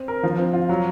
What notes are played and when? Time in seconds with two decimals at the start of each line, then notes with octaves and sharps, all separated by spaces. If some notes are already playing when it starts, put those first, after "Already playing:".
Already playing: C4
0.08 A#4
0.23 F3
0.38 C4
0.53 F4
0.69 F#3